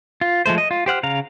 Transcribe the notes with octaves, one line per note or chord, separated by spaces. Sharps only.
F4
F3 G#3 A3 C5
D#5
F4
G4 C5 F#5 F6
C#3 F5 A#5